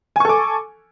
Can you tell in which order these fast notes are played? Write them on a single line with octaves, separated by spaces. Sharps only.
G#5 C#6 A4 D6